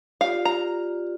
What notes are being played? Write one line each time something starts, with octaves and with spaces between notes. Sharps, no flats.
F4 G4 D5 F5
A#5